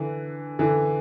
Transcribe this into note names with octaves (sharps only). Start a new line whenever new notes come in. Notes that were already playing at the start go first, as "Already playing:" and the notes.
Already playing: D3 E3
D3 E3